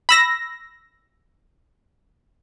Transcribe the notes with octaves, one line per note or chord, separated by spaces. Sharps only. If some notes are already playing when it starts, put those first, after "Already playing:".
B5 E6 A#6